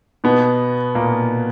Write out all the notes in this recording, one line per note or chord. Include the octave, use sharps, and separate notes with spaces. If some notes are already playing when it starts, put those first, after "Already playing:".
B2 B3
A#2 A#3